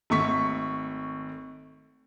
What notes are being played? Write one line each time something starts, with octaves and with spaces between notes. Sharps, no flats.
G#1 A3 C#6 B6